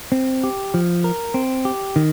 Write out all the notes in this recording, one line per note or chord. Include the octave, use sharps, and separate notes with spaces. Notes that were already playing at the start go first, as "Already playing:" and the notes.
C4
G4
F3
A#4
C4
G4
D#3